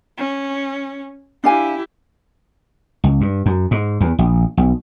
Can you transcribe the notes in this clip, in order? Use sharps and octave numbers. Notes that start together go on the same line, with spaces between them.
C#4
D4 E4 G4 F5 G#5
C#2
G2
F#2
G#2
E2
A#1
B1